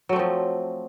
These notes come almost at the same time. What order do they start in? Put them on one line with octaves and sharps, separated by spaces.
F#3 A3 C4 F3